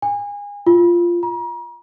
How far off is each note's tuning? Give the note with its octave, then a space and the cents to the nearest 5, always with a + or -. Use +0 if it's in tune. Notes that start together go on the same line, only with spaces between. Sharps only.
G#5 -30
F4 -10
A#5 +40